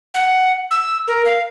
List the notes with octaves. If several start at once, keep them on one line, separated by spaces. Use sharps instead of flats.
F#5
E6
A#4
F5